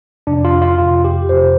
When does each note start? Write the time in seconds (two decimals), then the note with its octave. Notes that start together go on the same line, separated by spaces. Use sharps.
0.27 F2 C3 D4
0.45 F4
0.62 F4
0.78 F2 C3 F4
1.04 G4
1.29 F2 C3 C5